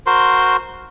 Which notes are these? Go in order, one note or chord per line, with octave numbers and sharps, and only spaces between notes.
F#4 A#4 C5 C6